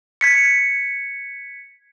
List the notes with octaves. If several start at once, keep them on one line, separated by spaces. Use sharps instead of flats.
G#6 B6 C#7